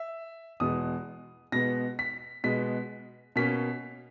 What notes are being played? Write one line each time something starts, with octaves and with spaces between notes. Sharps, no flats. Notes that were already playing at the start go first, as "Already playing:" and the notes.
Already playing: E5
E2 B2 G#3 B3 D#6
B2 G#3 B3 A#6
B6
B2 G#3 B3 B6
B2 A#3 C#4 B6